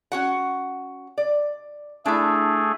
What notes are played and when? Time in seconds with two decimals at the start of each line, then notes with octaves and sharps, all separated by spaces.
0.12 C#4 F#4 F#5
1.18 D5
2.06 A3 D4 E4 G#4